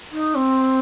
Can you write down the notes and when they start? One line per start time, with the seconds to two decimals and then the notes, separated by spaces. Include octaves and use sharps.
0.12 D#4
0.35 C4